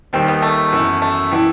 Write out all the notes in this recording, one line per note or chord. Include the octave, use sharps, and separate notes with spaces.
D#2 D#3 G3 C4 D#4
B3
A3
F#2 E3 B3 E4
A3
E3 G3 B3 E4